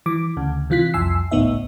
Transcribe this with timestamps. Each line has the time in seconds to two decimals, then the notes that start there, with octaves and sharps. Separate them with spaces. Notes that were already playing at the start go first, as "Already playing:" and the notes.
0.06 E3 D6
0.37 D2 C#3
0.70 C3 E3 F4 F#6 B6
0.94 C2 F2 G#5 E6 C7
1.31 G#1 C#2 A2 B3 D#4 E5